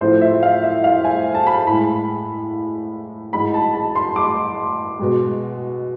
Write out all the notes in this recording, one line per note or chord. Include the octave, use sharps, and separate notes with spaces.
A2 F3 A3 C5
E5
F5
E5
F5
G#5
A5
B5
A2 G#3 B5
G#2 E3 G#3 B5
A5
A5
C6
D6
B2 G#3